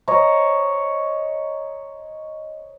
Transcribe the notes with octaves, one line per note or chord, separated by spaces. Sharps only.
C5 C#5 D#5 A#5